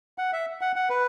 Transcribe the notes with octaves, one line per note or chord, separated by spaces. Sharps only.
F#5
E5
F#5
F#5
B4